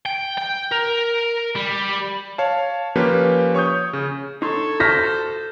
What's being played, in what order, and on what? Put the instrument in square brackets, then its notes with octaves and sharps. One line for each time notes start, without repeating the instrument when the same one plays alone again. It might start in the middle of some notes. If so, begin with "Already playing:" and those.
[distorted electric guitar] G5
G5
A#4
G3
[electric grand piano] C#5 F5 A5
F3 A#3 C#4 G4 B4
C#5 C#6 D#6 G6
C#3
[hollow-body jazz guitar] D#4 C6 [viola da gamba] A4 [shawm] C#5
[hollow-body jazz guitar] F#4 A5 [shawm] C5 [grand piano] F6 A#6 B6